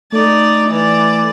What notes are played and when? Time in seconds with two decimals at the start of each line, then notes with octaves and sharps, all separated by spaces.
0.12 A3 D#4 D5
0.70 E3 D5